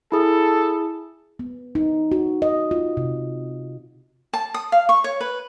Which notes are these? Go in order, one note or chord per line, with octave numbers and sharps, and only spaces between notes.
E4 G#4 A4
B3
D#4
F#4
D#5
F4
C3
A5
D#6
F5
C#6
C#5
B4